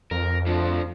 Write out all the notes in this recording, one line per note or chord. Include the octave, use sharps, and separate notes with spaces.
F2 A#4
F3 A3 D4